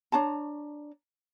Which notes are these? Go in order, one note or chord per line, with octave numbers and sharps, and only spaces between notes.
D4 C#5 A5 A#5